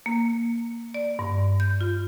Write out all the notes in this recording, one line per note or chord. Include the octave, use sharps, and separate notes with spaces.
A#3
D5
G2
G6
F4